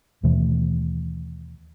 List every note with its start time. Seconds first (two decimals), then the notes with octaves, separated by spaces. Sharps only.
0.23 D#2 B2 E3 A3